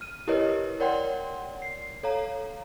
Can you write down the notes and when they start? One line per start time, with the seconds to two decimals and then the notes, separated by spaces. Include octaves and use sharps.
0.01 F6 D#7
0.28 E4 G4 A#4 B4 C#5 D#5
0.80 A#4 C#5 D5 F#5 G5 C6
1.62 C7
2.03 A4 C#5 F5 A#5